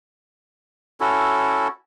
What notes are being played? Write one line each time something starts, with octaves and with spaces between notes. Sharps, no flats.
C#4 E4 F#4 A4